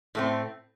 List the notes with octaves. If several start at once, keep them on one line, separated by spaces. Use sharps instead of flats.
A2 A3 C4